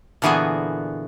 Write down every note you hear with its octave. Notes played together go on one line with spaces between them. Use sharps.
A#2 D3 E3 B3 F#4 G#4